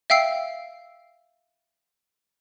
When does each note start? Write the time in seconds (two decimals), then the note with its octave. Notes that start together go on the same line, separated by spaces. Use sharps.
0.10 E5 F5 G5 E6 C7